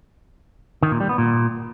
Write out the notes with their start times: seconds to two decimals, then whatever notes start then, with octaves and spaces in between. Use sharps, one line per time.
0.83 D#3
0.91 A#2
1.00 G3
1.09 B3
1.18 A#2